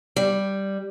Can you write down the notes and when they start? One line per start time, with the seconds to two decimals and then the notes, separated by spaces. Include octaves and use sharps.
0.16 G3